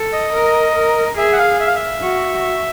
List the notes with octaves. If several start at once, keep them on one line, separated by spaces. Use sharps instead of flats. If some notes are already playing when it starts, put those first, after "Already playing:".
Already playing: A4
D#5
A#4
A#4
G#4 E5
F#5
F5
E5
F5
E5
F#4